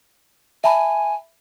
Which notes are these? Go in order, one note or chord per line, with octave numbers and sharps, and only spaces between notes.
E5 G#5 A5 B5